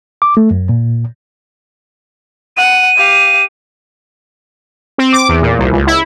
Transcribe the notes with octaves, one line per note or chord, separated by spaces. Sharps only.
D6
A3
F#2
A#2
F#5 D#7
G4 F5
C4
D6
E2
A#2
C2
C#2
E4